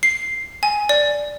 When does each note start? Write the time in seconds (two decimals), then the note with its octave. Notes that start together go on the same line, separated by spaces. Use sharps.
0.03 C7
0.63 G#5
0.89 D5